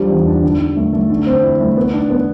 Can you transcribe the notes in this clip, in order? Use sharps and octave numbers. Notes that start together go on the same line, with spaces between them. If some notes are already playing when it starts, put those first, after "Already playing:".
Already playing: F3 G3 D4
E2
D4
D3
D3
A3
A3
D3
C4
E4
A3
B3
D4
B3